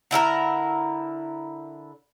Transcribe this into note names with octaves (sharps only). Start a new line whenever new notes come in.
D3 E4 A4 A#4